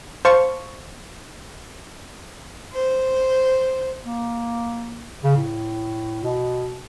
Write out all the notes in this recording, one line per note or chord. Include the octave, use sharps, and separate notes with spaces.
C5 F5 A5 C#6
C5
A#3
C#3
A2
B2